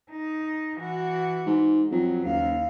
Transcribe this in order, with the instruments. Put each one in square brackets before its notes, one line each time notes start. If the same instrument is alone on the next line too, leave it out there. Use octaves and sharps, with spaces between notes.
[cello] D#4
E3 F#4
[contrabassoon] G#2
[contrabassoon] F2 [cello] F#3
[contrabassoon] F#1 [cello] D#2 F5